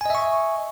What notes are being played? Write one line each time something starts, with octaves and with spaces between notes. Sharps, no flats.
D#5 E5 G#5 C#6